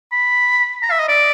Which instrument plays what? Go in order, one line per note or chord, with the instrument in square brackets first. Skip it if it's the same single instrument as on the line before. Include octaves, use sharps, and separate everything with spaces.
[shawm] B5
A#5
E5
D#5
D5